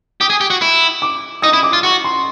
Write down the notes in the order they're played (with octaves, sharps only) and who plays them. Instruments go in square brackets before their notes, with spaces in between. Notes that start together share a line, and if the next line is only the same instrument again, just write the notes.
[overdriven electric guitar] G4 [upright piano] D#6
[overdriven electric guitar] G#4
G4
F#4
E4
[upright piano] D6
[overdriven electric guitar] D#4 [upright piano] D#6
[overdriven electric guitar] E4
[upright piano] D6
[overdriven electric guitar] F4
[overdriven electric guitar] F#4 [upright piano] C#6
[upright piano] C6